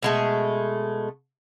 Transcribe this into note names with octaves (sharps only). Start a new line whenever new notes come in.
B2 G#3 A3